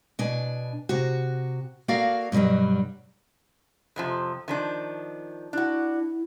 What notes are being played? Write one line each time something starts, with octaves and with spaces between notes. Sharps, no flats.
B2 D4 G#5
C3 F#4
A#3 F#4 A4 A#4 D5 F5
G2 B2 D3 F#3 G3
F2 C3 F3
D#3 F3 D4
D4 E4 F#4